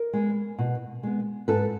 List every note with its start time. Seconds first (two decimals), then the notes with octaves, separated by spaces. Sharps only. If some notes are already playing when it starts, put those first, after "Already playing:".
Already playing: A#4
0.13 G#3 B3
0.58 B2
1.03 G#3 B3
1.48 G#2 A4 B4